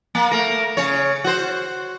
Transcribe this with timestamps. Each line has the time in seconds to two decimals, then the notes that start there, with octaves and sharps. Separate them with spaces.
0.15 A#3
0.31 A3 A#4
0.77 C#3 C#5
1.24 F#4 C5